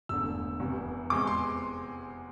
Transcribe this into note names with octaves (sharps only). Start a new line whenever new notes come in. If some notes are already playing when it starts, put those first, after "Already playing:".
E1 E2 D3 A3 E6
F1 E2 C3
E2 C3 G#3 C4 D6
C6